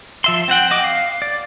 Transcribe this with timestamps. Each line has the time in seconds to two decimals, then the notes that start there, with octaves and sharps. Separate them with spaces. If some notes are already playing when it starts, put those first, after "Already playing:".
0.24 F3 E5 C6
0.48 C4 C5 F#5 G5
0.71 F#4 D#5 D6
0.84 F5
1.22 D5